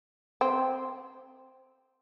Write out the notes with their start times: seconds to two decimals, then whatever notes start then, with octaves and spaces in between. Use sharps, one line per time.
0.41 C4